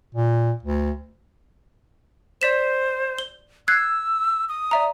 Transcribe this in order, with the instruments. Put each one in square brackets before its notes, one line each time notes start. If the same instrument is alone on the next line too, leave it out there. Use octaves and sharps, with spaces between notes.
[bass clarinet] A#2
D2
[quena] C5 [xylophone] D5 B6 E7
[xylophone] G7
[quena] E6 [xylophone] F#6 G#6 C7
[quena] D#6
[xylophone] D5 E5 A#5